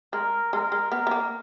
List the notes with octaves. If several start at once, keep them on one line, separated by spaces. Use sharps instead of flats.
G#3 A#4
G#3 A#4
G#3
B3 A#4
B3
A#3